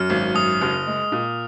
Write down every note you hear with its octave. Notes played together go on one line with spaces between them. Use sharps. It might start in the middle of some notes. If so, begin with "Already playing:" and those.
Already playing: F#2 F6
G#1
F#2 D#6
F#1
G#3
A#2